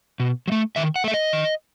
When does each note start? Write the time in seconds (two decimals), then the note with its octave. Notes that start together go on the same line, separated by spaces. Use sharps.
0.20 B2
0.48 F#3
0.52 A3
0.76 D#3 E5
0.96 F#5
1.04 A3 E5
1.14 D#5
1.33 D#3